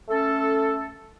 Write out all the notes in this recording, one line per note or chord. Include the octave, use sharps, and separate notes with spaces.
A3 C#4 A4